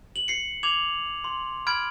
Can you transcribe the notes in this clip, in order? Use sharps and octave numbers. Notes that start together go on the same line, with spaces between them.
F#7
C7 C#7
D6 G#6 F7 F#7
C6
B5 F6 G#6 D7 F#7